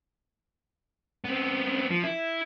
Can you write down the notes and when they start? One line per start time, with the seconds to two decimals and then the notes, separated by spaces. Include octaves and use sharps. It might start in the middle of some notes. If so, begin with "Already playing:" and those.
1.24 B3 C4
1.90 F3
2.04 E4